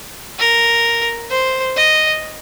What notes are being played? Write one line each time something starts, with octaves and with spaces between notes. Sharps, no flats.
A#4
C5
D#5